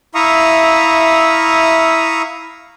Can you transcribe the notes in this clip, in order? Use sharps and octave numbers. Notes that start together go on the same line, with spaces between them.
E4 E5 F5 A#5 C#6 D#6